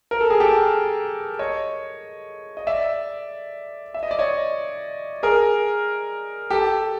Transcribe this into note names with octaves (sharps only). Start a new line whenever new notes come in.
A#4
A4
G#4
G4 A4
C#5 D#5
D#5
D5 E5
E5
D#5
D5
C#5 D#5
G#4 A#4
G4 A4